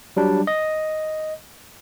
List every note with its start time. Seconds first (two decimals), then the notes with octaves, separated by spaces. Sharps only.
0.17 F#3 G3 D4
0.47 D#5